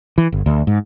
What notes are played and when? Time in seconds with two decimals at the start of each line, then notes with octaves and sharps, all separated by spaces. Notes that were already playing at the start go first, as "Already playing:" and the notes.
0.18 E3
0.32 G1
0.46 D2
0.67 G#2